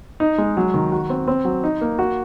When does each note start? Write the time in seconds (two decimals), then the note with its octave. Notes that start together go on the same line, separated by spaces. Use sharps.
0.20 D#4
0.38 G#3
0.57 F#3
0.74 D#3
0.92 F#4
1.10 C4
1.28 C4
1.45 F#3
1.64 D#4
1.81 A#3
1.99 F#4